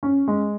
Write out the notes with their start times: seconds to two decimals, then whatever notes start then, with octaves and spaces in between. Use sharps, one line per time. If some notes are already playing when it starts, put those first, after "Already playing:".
0.03 C#4
0.28 G#3